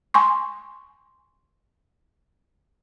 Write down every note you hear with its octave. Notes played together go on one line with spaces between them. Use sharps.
G#5 C6 C#6